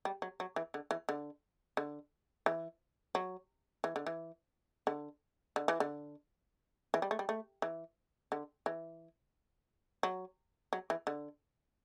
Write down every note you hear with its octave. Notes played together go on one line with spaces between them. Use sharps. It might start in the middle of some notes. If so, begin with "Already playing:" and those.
G3
F#3
F#3
E3
D3
E3
D3
D3
E3
F#3
E3
D3
E3
D3
D3
E3
D3
E3
G3
A3
G3
A3
E3
D3
E3
F#3
F#3
E3
D3